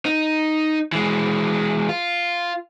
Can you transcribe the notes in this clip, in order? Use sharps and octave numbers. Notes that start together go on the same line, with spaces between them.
D#4
E3 G#3
F4